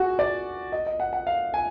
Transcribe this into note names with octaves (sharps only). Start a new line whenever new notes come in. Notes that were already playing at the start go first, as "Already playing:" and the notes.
Already playing: F#4 G#4
D5
D#5
D#5
F#5
F#5
F5
G#5